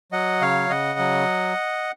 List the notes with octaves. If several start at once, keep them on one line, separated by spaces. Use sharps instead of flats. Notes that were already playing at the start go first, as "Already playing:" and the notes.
F#3 D#5 F#5
C#3 C#5 F5
C#3 D#5 F#5
F#3